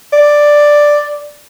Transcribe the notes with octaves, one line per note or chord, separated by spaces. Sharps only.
D5